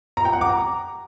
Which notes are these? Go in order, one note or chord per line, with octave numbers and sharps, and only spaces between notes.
A#5
G5
F#5
D6
A#5